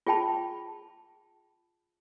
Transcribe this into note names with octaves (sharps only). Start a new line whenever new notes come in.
F4 G#4 G5 A5 B5